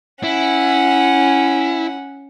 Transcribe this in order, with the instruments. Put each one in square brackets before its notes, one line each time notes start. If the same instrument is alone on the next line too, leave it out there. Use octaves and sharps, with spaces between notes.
[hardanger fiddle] C#4 F#5 [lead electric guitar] E4